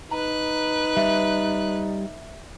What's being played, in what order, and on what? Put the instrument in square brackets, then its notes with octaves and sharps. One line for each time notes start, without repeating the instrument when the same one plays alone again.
[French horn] D#4 [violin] B4 F#6 [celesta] A#5
[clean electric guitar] G3 [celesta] E5